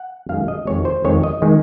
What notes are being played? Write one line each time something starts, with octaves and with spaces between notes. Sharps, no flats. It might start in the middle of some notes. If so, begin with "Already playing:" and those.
Already playing: F#5
F#2 D#3 G#3 F5
D#5
F2 D#3 G#3 C#5
C5
F2 D#3 G#3 C#5
D#5
D#3 G#3